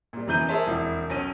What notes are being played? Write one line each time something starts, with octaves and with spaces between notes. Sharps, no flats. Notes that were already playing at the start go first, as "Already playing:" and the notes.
A#2 G3
F1 F#2 E3 G6 D#7
G#4 A#4 C5 C#5 E5 A5
E1 F2 E4
B1 C#4 D#7